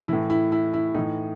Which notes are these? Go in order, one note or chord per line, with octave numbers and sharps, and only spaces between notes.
A2 E3 E4
E4
E4
E4
A2 E3 D#4